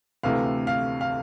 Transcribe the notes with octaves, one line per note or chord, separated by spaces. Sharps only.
D2 C3 E3 A3 F5
F5
F5